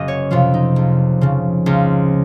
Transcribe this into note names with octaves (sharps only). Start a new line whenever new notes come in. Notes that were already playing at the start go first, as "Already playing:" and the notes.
Already playing: F#1 D#5
C#5
F2 C3 F3 F4
D#4
C#2
C#3 F3
C#2 F4